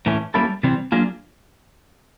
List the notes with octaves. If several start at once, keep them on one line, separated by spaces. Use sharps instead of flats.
A2 E3 A3 C#4
G3 A#3 C#4 E4 A4
C3 E3 G3 C4
F#3 A#3 D4 F4 G#4